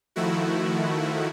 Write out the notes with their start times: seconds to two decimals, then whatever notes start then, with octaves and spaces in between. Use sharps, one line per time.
0.16 D#3 F3 A3 E4 F#4